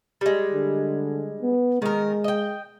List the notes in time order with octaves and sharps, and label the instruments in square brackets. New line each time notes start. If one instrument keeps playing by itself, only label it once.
[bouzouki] G3 G#3
[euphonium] D3
B3
[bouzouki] D#3 A#4 [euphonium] G#3
[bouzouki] D#5 G5